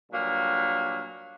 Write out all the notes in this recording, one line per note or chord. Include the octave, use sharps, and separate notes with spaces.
G2 A#2 F#3 A#3